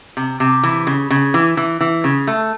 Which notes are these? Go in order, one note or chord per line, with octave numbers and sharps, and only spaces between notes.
C3
C3
E3
C#3
C#3
E3
E3
E3
C#3
A3